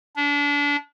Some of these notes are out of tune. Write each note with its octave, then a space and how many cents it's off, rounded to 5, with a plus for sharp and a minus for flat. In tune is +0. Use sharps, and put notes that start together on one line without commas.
D4 -30